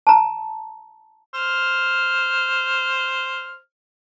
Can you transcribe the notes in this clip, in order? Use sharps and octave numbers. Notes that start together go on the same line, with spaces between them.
A5 A#5
C5 F6